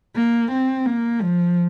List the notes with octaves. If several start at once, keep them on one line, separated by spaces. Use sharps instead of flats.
A#3
C4
A#3
F3